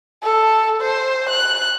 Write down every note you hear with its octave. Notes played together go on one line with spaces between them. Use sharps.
A4
C5
F#6